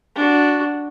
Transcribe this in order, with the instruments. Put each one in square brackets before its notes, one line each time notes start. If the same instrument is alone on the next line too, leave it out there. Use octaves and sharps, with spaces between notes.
[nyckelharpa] D4 F#4